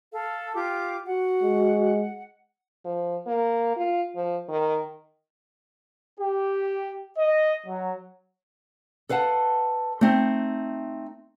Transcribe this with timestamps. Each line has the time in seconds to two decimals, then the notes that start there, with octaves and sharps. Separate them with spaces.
0.12 A4 F5
0.55 F4 G4 D6
1.07 F#4 F#5
1.42 G#3
2.85 F3
3.27 A#3
3.77 F4
4.16 F3
4.49 D#3
6.20 G4
7.19 D#5
7.67 F#3
9.09 A4 B4 F5 F#5 A5
10.01 A3 C4 D#4